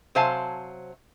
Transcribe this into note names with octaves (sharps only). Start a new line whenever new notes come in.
C3 F#3 C5 F5 G#5 A5